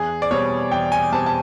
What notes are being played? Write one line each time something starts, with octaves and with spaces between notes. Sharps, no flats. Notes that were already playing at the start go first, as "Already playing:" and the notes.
Already playing: E2 G#4
D5
B2 G3 C4 C#5
E2 G5
G#5
B2 G3 C4 A5
A5